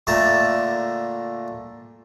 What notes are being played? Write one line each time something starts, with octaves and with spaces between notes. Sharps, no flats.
A#2 D3 A3 A5 A#5